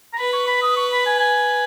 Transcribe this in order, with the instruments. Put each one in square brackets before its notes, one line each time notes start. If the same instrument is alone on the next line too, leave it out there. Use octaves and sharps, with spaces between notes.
[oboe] A#5
[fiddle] B4 [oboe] B5
[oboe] C#6
B5
D#6
C#6
B5
G#5
G#5